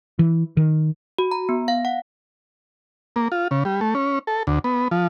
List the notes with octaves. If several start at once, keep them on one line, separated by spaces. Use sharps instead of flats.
E3
D#3
F#4
A#5
B3
F5
F#5
A#3
F4
C#3
G3
A3
C#4
A4
D2
B3
F3